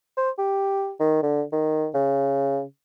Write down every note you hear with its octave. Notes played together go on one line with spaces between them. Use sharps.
C5
G4
D#3
D3
D#3
C#3